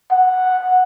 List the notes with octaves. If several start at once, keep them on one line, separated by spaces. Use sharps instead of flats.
F#5